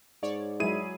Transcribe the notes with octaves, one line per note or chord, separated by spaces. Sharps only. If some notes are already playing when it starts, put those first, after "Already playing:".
G#2 C#5 D5
F#3 G#3 E4 G#4 D#7